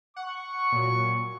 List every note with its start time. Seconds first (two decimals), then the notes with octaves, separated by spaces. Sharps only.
0.16 F#5 C#6
0.72 A#2 F#3